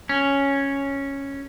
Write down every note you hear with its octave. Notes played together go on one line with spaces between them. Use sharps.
C#4